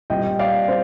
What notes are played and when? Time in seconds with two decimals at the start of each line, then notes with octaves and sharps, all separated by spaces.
0.10 A#2 G3 C4 D#5 G5
0.39 D5 F5
0.68 C4 C5